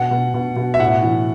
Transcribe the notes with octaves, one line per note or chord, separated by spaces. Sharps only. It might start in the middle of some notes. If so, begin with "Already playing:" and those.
Already playing: B2 F#5
B2
B2
B2
E5
A2 F#5
E3